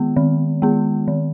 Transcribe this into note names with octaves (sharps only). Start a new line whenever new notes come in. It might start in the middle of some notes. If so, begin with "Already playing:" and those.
Already playing: D#3 G#3 B3
D#3
G#3 B3
D#3